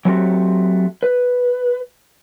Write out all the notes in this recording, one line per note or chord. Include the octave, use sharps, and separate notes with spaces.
F#3 A3 C4 F#4 G4
B4